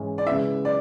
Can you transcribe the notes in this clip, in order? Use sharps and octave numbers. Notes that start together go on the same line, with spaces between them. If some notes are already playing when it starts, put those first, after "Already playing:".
Already playing: G#2 E3 G#3 C#4
D5
C#3 G#3 B3 E4 E5
D5